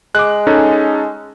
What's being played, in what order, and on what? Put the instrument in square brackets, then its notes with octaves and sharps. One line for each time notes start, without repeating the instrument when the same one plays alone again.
[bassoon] G#3 [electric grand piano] D6 F#6
[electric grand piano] C#4 D#4 A4